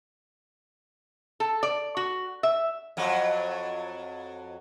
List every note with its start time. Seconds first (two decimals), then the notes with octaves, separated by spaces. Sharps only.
1.40 A4
1.63 D5
1.97 F#4
2.43 E5
2.97 F2 F#3